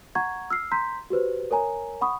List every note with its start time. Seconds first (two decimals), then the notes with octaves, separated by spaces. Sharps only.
0.15 F#5 A#5 C#6 G#6
0.50 E6 F6 C7
0.72 A#5 C6 G6 B6
1.10 F#4 G4 B4 C5
1.51 A#4 C#5 G#5 A#5
2.01 F#5 B5 C#6 D#6